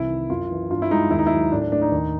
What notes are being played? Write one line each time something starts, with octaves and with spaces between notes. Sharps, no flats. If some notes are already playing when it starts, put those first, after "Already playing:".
Already playing: C2 E3 E4
D#3
F#2 F4
E3
G2 F4
E4
G#3 D#4
D#2 E4
D#4
F#3 E4
A2 D4
D4
A3 D4
D#4
D#2